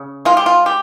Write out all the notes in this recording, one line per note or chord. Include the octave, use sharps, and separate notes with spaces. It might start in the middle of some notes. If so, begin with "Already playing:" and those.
Already playing: C#3
G#3 F4
G4
F4
G4